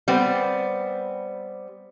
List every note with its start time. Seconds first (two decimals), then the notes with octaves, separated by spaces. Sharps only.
0.08 G3 B3 C4